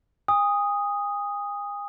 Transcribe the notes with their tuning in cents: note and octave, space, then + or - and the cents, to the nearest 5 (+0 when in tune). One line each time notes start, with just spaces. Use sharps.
G#5 -40 D#6 +0